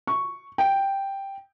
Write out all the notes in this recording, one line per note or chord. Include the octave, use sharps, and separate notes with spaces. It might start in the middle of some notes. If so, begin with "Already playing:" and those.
C#6
G5